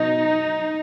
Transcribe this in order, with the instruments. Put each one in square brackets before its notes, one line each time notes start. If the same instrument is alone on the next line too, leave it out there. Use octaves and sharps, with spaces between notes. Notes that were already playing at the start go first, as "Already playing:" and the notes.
Already playing: [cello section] B2 F#3 D#4